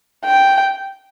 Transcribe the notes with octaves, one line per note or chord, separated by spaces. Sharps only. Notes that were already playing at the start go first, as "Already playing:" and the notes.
G5